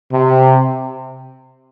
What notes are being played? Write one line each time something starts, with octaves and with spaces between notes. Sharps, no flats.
C3